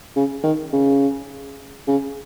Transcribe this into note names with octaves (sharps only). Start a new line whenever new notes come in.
C#3
D#3
C#3
C#3